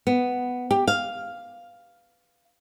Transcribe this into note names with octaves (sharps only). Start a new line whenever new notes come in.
B3
G4
F5